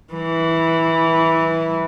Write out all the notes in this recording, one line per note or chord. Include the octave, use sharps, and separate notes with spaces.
E3